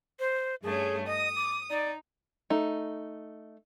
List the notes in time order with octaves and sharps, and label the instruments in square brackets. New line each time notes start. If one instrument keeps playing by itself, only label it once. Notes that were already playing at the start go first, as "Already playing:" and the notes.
[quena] C5
[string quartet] G2 A3 C#4 [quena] G#4
[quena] D#5 [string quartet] D#6
[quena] D6
[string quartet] D#4 [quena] D5
[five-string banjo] A3 D#4